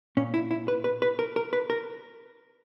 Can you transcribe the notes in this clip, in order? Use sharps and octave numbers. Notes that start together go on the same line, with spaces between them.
A#2 C#4
E4
E4
B4
B4
B4
A#4
A#4
B4
A#4